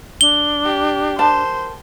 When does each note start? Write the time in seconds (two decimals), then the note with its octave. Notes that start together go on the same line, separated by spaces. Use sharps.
0.21 D4 G7
0.65 G4
1.19 A#4 C5 A5